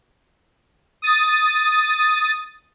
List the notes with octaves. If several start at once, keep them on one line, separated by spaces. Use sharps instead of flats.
D#6 A6